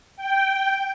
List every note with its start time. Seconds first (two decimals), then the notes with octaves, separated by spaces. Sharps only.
0.16 G5